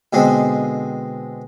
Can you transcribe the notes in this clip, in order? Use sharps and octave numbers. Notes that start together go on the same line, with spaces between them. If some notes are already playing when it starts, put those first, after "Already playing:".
B2 D3 G#3 C4